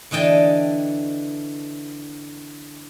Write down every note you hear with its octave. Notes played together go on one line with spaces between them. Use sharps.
D3 E3 D#5 G5 A5